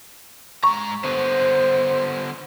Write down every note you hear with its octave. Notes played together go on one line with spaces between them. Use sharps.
G#2 A#5 C#6
D3 B3 C5